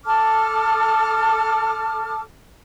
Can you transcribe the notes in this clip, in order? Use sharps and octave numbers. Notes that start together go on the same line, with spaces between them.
A4 A5 D6 F6